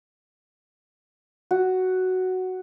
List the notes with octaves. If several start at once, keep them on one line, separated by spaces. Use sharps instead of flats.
F#4